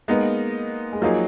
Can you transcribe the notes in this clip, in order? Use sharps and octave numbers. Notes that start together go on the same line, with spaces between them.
G#3 A#3 B3 D#4
G#3
F3 F#3 A#3 D#4 G#4